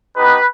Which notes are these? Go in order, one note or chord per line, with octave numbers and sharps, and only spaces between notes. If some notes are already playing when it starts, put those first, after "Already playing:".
B3 D#4 G4 B4